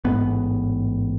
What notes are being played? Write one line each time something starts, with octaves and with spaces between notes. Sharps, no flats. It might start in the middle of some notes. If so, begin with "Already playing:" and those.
A1 G#2 B3